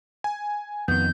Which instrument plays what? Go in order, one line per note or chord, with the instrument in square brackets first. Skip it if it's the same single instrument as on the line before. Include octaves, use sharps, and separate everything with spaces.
[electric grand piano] G#5
[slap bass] F2 D#3 [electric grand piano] B3 [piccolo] G6